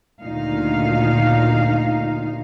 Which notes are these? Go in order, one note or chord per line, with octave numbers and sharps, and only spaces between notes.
D2 A#2 D#3 D#4 F5